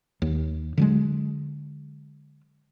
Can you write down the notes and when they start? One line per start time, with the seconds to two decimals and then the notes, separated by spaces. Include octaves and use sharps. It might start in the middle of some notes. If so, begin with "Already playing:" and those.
0.22 D#2
0.77 D3 F#3 G#3